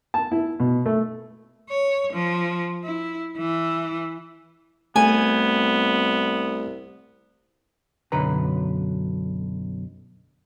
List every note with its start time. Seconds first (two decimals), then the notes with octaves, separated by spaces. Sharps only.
0.14 A5
0.31 E4
0.60 B2
0.86 A3
1.70 C#5
2.13 F3
2.84 E4
3.38 E3
4.96 C2 A3 B3 G#5
8.12 B1 F#2 D3 B4 A#5